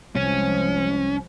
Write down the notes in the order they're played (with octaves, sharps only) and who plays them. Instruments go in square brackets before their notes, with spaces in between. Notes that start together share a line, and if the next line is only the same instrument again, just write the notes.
[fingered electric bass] C2 [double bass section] F3 G#3 [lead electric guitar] C#4